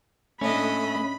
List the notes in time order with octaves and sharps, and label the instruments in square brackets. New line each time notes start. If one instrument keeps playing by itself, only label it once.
[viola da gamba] A2 D4 D#5 [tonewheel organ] A3 [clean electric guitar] C#4 [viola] B5